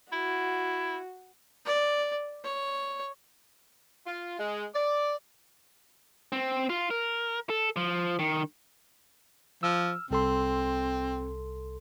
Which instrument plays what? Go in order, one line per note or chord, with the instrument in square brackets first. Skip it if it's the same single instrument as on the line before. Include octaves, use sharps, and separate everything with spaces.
[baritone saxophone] E4 [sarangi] F#4
[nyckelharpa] D5
C#5
[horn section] F4
G#3
D5
[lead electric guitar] C4
F4
A#4
A4
F3
D#3
[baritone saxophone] F3 [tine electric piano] E6 F6
[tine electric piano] C2 A4 C6 [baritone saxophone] C4